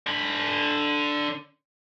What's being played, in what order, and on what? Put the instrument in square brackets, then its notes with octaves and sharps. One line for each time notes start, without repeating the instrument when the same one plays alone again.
[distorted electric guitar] D3 B5